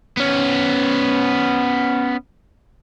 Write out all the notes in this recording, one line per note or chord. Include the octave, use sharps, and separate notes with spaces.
B3 C#4